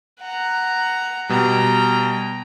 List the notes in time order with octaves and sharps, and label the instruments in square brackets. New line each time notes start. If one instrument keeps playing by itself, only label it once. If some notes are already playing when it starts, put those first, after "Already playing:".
[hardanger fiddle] F#5 A#5
[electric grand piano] B2 G3 [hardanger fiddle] G5 A#5